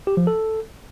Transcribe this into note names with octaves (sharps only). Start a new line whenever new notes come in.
G4
F3
A4